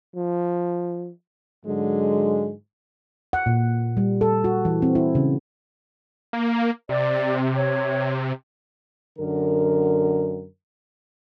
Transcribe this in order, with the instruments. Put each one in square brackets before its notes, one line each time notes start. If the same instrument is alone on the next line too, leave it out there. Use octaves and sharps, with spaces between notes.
[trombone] F3
[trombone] G#2 [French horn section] D3 F#3 G#3
[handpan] F#5
A#2
G3
A4
F#4
E3
C4
E4
C#3
[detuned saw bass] A#3
[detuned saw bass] C3 [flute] D5
[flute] C#5
[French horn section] F#2 D3 A#4